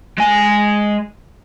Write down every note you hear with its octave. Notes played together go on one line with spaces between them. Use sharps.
G#3 G#5